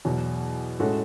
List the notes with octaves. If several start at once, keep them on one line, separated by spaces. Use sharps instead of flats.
E2 B2 F#3
A2 G#3 C#4 F#4 A4